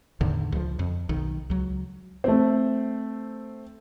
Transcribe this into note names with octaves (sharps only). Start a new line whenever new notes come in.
E2 A2 D3 D#3
C#2 F3
F2
B1 D#3
C#2 F#3
A3 C4